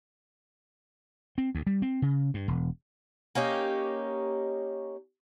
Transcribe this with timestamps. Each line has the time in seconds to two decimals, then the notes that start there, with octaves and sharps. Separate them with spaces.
1.38 C4
1.55 D2
1.67 G3
1.82 C4
2.02 C#3
2.34 G2
2.48 E1
3.35 A#3 C#4 D#4 G4